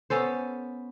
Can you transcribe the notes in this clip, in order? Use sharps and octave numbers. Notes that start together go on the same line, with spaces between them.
B3 C#4 A4 C5